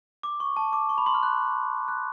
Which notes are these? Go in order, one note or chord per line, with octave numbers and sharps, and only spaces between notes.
D6
C#6
A5
D6
C#6
B5
C6
F6
F#6
F#6